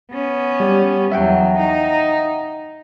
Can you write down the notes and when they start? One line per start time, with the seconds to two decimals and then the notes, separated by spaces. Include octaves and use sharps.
0.12 B3 C#4
0.60 G3 G4
1.12 E2 F#3 E5 F#5 G5
1.58 D#4